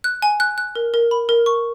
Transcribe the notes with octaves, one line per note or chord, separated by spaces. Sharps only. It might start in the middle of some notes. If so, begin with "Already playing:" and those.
F#6
G#5
F#6
F#6
A#4
A#4
B5
A#4
C#6